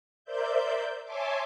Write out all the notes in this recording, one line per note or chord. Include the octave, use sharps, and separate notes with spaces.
A#4 C5 D5 E5 G6
C#5 E5 G#5 A5 C6 D6